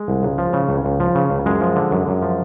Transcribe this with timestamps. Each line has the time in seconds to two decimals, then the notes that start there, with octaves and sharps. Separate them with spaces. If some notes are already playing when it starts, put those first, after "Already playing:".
Already playing: G#3
0.08 C2
0.23 C#2
0.38 F3
0.53 C#3
0.69 C#2
0.85 C#2
1.00 F3
1.15 C#3
1.30 C#2
1.46 F#2 G#3
1.61 F3
1.76 D3
1.91 F#2
2.08 F#2
2.22 F3